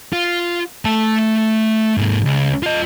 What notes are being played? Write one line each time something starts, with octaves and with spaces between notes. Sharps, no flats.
F4
A3 A5
G#2 A#3
C#2
F4 D#5